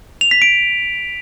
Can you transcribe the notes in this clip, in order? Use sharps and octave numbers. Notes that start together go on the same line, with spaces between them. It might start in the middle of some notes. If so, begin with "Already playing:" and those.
F7
B6
D7